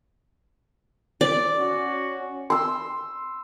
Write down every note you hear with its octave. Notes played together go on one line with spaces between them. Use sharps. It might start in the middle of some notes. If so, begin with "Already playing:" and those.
D5
C#4 F#4
C6 E6